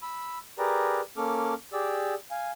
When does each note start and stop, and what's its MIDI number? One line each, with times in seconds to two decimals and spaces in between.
0.02 0.38 83
0.02 0.38 88
0.59 1.01 67
0.59 1.01 68
0.59 1.01 70
0.59 1.01 71
0.59 1.01 74
0.59 1.01 82
1.17 1.54 58
1.17 1.54 61
1.17 1.54 69
1.17 1.54 86
1.17 1.54 89
1.73 2.14 67
1.73 2.14 68
1.73 2.14 74
1.73 2.14 88
2.31 2.51 77
2.31 2.51 80